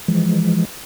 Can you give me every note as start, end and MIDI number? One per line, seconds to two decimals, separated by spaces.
0.08 0.65 52
0.08 0.65 53
0.08 0.65 56